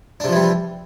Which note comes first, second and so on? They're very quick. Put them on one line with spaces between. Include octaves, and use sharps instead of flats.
D4 C3 F3 E3 G3